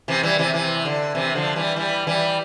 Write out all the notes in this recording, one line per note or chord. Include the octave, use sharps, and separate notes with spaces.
C3 E3
E3 G3
C3 E3
C3 E3
D3
C3 E3
D3 F3
E3 G3
E3 G3
E3 G3